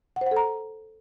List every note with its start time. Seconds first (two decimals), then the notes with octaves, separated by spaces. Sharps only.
0.16 F#5
0.21 C5
0.26 F#5
0.31 A4
0.37 A#5